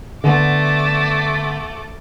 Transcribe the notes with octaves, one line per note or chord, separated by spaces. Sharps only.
D3 A3 B3 D6